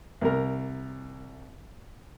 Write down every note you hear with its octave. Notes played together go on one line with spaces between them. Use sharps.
C2 A#4